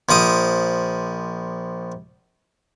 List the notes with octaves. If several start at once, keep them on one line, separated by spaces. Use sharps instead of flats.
A#1 F3 D6 D#6